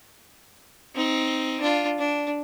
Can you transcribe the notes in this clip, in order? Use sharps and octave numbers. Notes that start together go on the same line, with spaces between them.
C4 D#4
D4 F4
D4